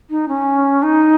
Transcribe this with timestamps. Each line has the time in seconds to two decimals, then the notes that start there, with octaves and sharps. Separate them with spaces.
0.10 D#4
0.28 C#4
0.83 D#4